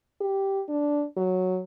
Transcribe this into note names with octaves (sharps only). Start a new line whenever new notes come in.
G4
D4
F#3